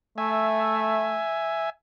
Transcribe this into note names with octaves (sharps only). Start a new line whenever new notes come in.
A3 E5 G#5